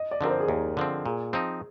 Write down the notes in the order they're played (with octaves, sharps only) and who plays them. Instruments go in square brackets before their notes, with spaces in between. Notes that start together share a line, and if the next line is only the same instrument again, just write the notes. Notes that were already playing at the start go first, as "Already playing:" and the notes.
Already playing: [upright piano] D#5
D5
[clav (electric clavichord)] D3 F3 C4 [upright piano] A#4
[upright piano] C5
G#4
[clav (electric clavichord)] D#2 [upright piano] A#4
[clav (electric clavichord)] D3 F3 C4
[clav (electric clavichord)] A#2 [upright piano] G#4
[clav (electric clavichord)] F3 C4 D#4